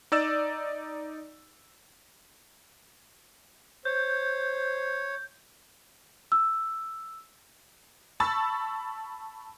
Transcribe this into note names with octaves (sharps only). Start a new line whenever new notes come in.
D#4 D5 E6 A6 E7
C5 C#5 G6
E6
A5 B5 C#6 E6 A6